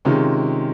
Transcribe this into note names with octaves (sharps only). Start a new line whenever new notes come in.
C3 D#3 G#3 C#4 F4